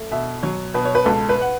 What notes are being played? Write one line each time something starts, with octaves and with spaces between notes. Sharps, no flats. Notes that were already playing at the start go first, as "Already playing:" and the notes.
Already playing: A3
B2 E5
F#3 C#5
B2 B4
C#5
B4
C#2 A4
B4
F#5